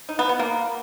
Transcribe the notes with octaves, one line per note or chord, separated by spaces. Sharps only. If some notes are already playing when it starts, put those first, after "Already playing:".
D#4
B3
B3
A#3